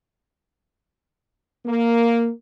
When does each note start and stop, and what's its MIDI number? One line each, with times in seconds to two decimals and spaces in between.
1.65 2.28 58